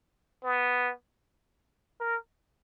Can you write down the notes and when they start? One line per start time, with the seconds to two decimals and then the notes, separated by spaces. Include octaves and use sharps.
0.44 B3
2.00 A#4